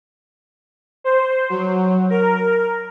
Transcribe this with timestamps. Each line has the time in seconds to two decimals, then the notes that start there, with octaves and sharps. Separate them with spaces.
1.04 C5
1.50 F#3
2.10 A#4